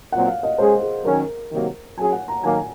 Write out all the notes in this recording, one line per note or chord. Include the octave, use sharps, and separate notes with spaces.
A#2 F#3 C4 F#5
F5
D#5
G#3 C#4 G#4 C5
G#4
D#3 F#3 C#4 A#4
C3 D#3 F#3 A#3
F#3 C#4 G#4 G#5
F#5
A#5
D#3 F#3 A#3 G#5